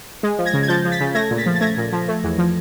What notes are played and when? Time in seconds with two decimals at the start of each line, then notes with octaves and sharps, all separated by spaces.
0.23 G#3
0.38 F3
0.46 G#6 A#6
0.53 C#3
0.63 G#6
0.68 F3 G6 A6
0.85 F3
0.91 A6 B6
1.00 C#3
1.15 A3 G#6 A#6
1.31 A#2
1.38 A6 B6
1.46 F3
1.56 A6
1.61 A3 G#6 A#6
1.78 A#2
1.93 F3
2.08 A3
2.24 E2
2.38 F3